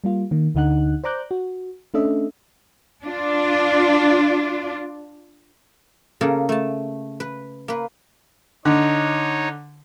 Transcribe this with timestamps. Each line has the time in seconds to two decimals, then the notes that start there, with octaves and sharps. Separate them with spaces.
0.04 G3 A#3 F4
0.31 D#3 A#3
0.55 D2 D3 D#4 F#5 F#6
1.04 C5 D5 A#5 D6 F#6 G6
1.31 F#4
1.94 A3 C#4 D4 A4 D#5 E5
3.04 D4 F4
6.21 C#3 A#3 A4
6.49 A3 A5
7.20 B4
7.68 A#3 B4
8.65 D3 D#4 C#5